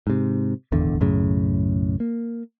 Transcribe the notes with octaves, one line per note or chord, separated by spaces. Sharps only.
G#2 C3
D#1 G#1 E2 D3
B1 F#2 A2 C#3
A#3